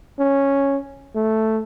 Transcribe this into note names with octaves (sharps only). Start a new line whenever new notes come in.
C#4
A3